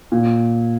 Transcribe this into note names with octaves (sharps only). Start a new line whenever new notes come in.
A#2